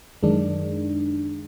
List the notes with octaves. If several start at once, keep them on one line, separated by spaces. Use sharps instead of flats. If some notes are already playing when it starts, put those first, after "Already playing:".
F#2 D#3 G#3 D4